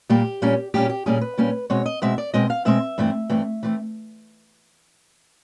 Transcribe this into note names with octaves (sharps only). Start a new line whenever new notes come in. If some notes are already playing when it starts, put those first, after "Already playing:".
A#2 G3 A#3 G4
A#2 G3 A#3 C#4
A#2 G3 A#3 C#4 G4
G4
A#2 G3 A#3 C#4 G#4
B4
A#2 G3 A#3 C#4
B2 G#3 C4 C#5
D#5
B2 G#3 C4 E5
D5
B2 G#3 C4 D#5
F5
B2 G#3 C4 E5
G2 E3 A3 C4
G2 E3 A3 C4
E3 A3 C4